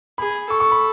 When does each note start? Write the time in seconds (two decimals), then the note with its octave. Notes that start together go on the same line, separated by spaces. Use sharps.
0.18 G#4 B5
0.50 A4 C#6
0.60 C#6
0.72 B5